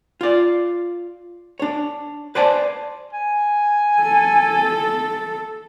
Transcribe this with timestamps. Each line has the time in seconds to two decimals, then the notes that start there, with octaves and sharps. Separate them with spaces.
0.21 F4 D5
1.60 D4 C#5
2.35 B4 C5 D5 G#5 A5
3.13 G#5
4.02 A4